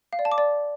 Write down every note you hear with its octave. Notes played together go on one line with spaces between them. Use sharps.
F5
D5
A5
D6
D5